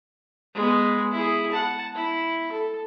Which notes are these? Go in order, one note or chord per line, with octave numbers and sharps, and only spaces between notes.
G#3 B3
E4 G#4
F#5 A5
E4
A4